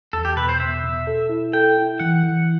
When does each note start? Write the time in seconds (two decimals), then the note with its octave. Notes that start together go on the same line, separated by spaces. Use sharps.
0.13 E2 A4
0.25 G4
0.37 B2 B4
0.49 C5
0.60 B2 E5
0.84 B2
1.07 A4
1.29 E4
1.53 A4 G5
1.77 E4
1.99 E3 F#5
2.23 E3